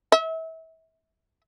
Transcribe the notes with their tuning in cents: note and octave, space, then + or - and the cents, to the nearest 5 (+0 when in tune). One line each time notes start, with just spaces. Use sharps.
E5 -30